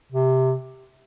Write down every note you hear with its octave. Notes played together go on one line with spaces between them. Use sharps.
C3